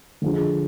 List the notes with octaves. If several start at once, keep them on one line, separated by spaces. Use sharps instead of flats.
D3 F3 G#3